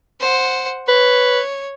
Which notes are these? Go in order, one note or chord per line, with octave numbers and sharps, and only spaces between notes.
C5 F#5
B4 C#5